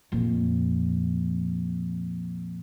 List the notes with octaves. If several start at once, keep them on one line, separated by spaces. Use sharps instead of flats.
F2 A#2